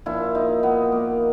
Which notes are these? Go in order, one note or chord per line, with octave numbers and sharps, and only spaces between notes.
A#2 F3 E4
D#4
B3
A#3